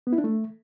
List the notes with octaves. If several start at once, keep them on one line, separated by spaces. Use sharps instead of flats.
B3
E4
D4
A3